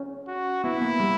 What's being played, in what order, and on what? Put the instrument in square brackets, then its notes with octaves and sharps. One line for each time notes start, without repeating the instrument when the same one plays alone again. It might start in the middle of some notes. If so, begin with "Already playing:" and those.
Already playing: [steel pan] C#4
[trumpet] F#4
[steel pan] B3 [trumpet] E4
[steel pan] A#3
G3